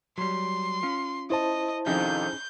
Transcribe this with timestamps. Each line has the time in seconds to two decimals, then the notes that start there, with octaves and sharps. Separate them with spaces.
0.18 F#3 G3 C6
0.83 C#4 F4
1.30 E4 C5 D#5 A5
1.86 F2 C3 D#3 C#4 D#4 G#4 G6